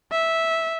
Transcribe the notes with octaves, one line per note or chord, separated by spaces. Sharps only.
E5